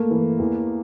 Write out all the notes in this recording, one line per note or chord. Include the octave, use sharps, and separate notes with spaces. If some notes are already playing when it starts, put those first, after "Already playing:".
Already playing: A3 A#3
E3
E2